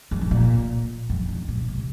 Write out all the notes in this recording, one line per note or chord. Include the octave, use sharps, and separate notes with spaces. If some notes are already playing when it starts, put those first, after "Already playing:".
F2
G#2
A#2
F2
G#2
A#2
C3